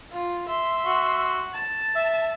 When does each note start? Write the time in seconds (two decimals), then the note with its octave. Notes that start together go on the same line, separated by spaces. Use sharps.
0.12 F4
0.48 E5 C6
0.86 F#4
1.54 A5
1.96 E5